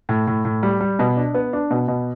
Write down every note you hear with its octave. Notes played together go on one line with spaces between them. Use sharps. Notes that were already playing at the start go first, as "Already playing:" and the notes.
A2
A2
A2
G3
G3
B2
D4
B3
D4
B2
B2